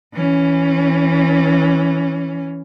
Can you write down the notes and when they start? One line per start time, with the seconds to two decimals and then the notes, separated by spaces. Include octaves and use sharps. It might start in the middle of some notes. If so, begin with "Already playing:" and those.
0.14 E3 C#4